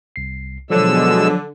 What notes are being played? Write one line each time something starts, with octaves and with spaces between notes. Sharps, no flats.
C2 C7
B2 D3 F3 F#3 G#3 C#5 E6